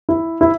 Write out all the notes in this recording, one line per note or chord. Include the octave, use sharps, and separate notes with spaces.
E4
E4